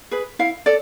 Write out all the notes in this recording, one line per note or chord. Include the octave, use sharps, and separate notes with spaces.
G#4 B4
E4 F5
A4 D5